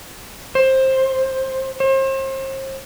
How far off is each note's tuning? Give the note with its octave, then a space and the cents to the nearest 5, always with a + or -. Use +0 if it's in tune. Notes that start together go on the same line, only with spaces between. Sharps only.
C5 +15
C5 +40